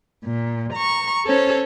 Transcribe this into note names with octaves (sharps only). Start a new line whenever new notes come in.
A#2
A#5 C#6
C#4 A4 C5 C#5